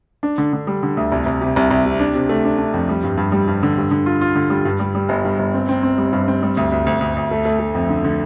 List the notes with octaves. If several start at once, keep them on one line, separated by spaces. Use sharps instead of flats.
D4
D3
D3
G3
D3
D2
C2
C2
C3
C2
C2
C3
D4
C3
A3
D4
D4
F2
G3
G2
G2
G3
G2
D3
G2
D3
F4
F4
D3
G3
G2
G3
G3
G1
G2
G1
C4
C4
C4
G3
G2
C4
G3
D2
D2
D2
D2
D2
A3
A3
A3
F2
D3
D3